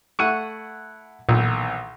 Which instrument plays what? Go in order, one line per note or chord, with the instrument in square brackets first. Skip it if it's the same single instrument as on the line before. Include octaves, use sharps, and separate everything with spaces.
[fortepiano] A3 E4 F#5 [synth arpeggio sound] C#6 C#7 D#7
[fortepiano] B1 D#3 E3 [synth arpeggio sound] A#2